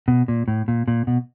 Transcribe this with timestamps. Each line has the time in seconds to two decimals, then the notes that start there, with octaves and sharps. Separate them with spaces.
0.08 B2
0.28 A#2
0.48 A2
0.68 A#2
0.88 A#2
1.07 B2